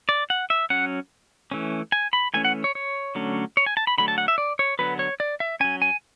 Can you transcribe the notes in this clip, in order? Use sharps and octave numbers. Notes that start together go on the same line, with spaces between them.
D5
F#5
E5
F#3 C#4 F#5
E3 A3 C#4
G#5
B5
E3 A3 C#4 G#5
F#5
C#5
C#5
D3 F#3 A3 C#4
C#5
G#5
A5
B5
D3 F#3 A3 B5
A5
F#5
E5
D5
C#5
D3 F#3 B3 B4
C#5
D5
E5
F#3 C#4 G#5
G#5